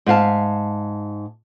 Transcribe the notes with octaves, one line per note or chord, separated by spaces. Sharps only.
G#2 E5 F5 A5